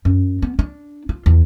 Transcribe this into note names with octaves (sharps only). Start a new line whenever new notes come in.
F#2
B3
D4
F4
E2